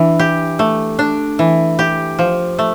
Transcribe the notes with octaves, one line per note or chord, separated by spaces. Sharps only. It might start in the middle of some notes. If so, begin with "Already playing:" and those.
Already playing: E3 D4
G4
A3
D4
E3
G4
F3
A3